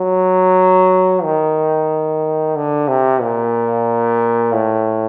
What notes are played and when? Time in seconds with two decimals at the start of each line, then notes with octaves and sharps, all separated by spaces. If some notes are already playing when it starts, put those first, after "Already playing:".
Already playing: F#3
1.24 D#3
2.56 D3
2.88 C3
3.21 A#2
4.53 A2